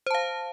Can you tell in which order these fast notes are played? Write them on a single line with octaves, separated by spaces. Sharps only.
C5 A5 F5